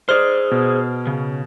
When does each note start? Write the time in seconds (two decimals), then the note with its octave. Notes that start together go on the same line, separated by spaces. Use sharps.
0.09 G#4 C5 D5 F6
0.51 B2
1.07 C#3